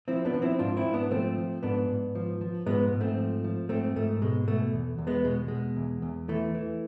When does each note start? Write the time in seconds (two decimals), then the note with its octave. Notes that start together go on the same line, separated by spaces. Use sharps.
0.08 F3 C4 E4
0.25 B3 D4
0.34 F3
0.42 C4 E4
0.59 G#2 D4 F4
0.77 C4 E4
0.85 G#2
0.94 B3 D4
1.11 F3 A3 C4
1.38 F3
1.63 G#2 B3 D4
1.89 G#2
2.15 F3
2.41 F3
2.66 G#2 G#3 B3
2.92 G#2
3.00 A3 C4
3.18 F3
3.44 F3
3.69 G#2 A3 C4
3.96 G#2 A3
4.22 B2 G#3
4.48 B2 A3
4.73 E2
4.98 E2
5.07 G#3 B3
5.25 B2 G#3
5.48 B2 G#3
5.76 E2
6.02 E2
6.28 E3 A3
6.55 E3